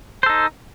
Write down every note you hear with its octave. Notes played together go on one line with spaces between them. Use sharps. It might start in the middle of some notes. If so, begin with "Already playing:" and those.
D#4 A4 C5